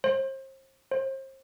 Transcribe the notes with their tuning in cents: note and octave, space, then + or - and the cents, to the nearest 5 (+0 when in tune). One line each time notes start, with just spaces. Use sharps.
C5 +35
C5 +35